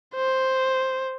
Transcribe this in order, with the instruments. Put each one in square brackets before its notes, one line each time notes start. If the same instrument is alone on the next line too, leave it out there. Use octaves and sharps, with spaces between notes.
[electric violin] C5